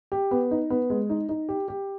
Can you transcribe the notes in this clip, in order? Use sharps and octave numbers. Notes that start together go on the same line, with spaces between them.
G4
B3
D#4
B3
G#3
D#4
D#4
G4
G4